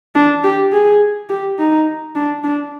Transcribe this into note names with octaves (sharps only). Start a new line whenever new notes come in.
D4
G4
G#4
G4
D#4
D4
D4